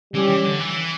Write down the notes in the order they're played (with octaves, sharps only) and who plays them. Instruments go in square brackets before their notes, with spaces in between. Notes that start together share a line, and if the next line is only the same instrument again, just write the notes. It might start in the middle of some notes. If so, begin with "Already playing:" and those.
[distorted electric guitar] E3 [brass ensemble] G3 C#4 G4
[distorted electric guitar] E3
D3
E3